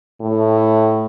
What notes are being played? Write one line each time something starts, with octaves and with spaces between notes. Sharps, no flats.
A2